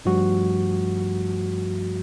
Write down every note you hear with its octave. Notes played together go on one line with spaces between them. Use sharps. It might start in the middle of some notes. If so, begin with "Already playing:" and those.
G2 F3 G3 A3 F#4